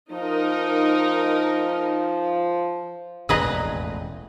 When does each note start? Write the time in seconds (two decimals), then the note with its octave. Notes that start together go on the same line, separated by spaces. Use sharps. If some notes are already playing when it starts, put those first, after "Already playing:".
0.12 F3 D#4 A#4
3.29 E1 A1 F2 G#4 B4 D#5 A#5 D#6